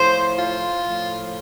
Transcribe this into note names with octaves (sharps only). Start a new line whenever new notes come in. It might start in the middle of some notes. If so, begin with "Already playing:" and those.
Already playing: A2 F3 C5
F4
A2 F3